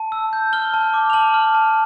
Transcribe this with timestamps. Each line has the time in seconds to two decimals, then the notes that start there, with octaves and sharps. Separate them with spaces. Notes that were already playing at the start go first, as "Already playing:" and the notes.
Already playing: A5
0.12 E6
0.33 G6
0.53 F6 G7
0.74 A5
0.94 D6
1.10 F7
1.13 A5 F#7
1.34 F6
1.55 A5